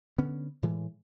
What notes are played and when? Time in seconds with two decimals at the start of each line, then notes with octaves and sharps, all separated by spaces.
0.18 D3 B3 C#4
0.63 A2 E3 G#3